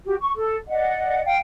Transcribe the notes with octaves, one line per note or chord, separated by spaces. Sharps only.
F#4 G4
C#6
A4
D5 D#5 F#5
F5 G5